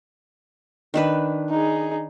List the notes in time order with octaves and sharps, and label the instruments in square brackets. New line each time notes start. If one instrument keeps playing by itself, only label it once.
[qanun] D#3 D4 B4
[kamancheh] D#4 G#4